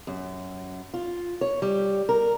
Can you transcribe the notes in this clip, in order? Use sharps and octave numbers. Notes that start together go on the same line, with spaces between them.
F#2
F4
C#5
G3
A#4